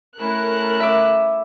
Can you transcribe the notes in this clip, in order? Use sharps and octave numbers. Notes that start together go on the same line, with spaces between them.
A3 C#4 E4 A4 A#4 F#6
E5 D6